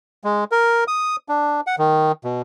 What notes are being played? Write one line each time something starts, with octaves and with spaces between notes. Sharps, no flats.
G#3
A#4
D#6
D4
F#5
D#3
B2